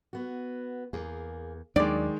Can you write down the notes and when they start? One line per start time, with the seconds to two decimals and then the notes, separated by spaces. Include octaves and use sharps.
0.13 B3 F#4
0.93 E2 A#3 G#4
1.76 D#2 D#3 F#3 G#3 D4 D5 G5